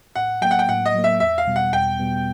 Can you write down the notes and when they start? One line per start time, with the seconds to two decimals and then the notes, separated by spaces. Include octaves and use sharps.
0.16 A2 F#5
0.42 F#3 A#3 G5
0.51 F#5
0.59 G5
0.69 A2 F#5
0.86 D#5
0.95 F#3 A#3
1.04 E5
1.20 E2 E5
1.38 F5
1.47 B2 G3 B3
1.56 F#5
1.73 E2 G5
2.00 B2 G3 B3